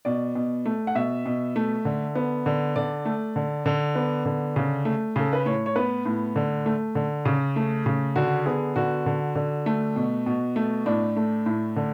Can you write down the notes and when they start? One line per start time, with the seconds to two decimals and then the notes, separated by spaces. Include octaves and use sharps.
0.05 B2 D5
0.35 B2
0.65 A3
0.87 F#5
0.95 B2 E5
1.26 B2
1.56 A3
1.85 D3
2.15 B3
2.46 D3
2.76 D3 D5
3.05 A3
3.36 D3
3.66 D3
3.95 B3
4.26 D3
4.56 C#3
4.85 A3
5.16 C#3 A4
5.33 B4
5.46 A2 C#5
5.66 C#5
5.76 B3 B4
6.06 A2
6.36 D3
6.66 A3
6.95 D3
7.25 C#3
7.56 A3
7.86 C#3
8.16 D3 F#4
8.46 B3 G#4
8.76 D3 F#4
9.06 D3
9.35 D3
9.66 A3
9.96 B2
10.26 B2
10.56 A3
10.86 A2 D4
11.16 A3
11.46 A2
11.76 D3